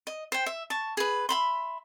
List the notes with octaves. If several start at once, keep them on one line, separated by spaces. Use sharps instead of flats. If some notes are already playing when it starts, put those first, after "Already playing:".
D#5
C5 G5
E5
A5 C#6
G#4 B4
E5 B5 C6